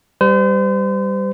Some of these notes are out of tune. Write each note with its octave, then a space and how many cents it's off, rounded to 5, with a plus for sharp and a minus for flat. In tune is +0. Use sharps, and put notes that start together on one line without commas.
G3 +0 C5 -40